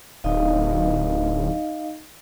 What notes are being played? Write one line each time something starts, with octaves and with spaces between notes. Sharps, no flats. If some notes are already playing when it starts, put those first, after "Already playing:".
D1 D#4 D#5 F5